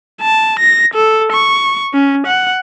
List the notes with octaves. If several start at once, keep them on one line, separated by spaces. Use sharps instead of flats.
A5
A#6
A4
C#6
C#4
F#5